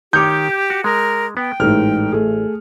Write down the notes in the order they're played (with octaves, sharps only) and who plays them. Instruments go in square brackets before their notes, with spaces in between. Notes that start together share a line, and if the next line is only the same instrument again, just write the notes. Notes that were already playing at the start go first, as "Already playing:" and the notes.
[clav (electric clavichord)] D#3 C#5 [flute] G4 [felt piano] D6 G6
[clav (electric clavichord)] F#4
[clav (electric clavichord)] G#3 [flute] A#4
[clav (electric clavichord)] B3 [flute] G5
[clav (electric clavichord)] A1 [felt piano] G#2 A3 F6
[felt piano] A3 G#4